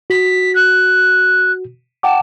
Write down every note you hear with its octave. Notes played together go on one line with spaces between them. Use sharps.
F#4 B6
F#6
F#5 G5 A5 D6